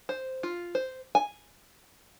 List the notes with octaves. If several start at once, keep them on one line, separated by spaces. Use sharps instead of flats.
C5
F4
C5
G#5